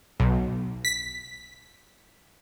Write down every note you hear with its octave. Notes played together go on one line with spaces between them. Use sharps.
B1
B6